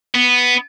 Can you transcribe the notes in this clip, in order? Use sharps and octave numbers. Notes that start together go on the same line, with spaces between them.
B3